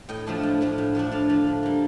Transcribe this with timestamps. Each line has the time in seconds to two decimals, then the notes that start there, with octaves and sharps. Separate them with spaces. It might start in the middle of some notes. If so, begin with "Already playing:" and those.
0.09 A2 D#5 G5
0.27 F3 A3 D4
0.43 A2
0.61 F3 A3 D4
0.78 A2
0.95 F3 A3 D4
1.11 A2 D5 F5
1.29 F3 A3 D4
1.47 D3
1.63 G3 A#3